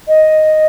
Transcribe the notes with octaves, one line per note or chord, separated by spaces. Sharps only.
D#5